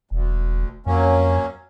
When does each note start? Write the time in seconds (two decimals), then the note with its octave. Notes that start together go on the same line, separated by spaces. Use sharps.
0.11 E1 D2
0.86 F2 F#3 A#3 C#4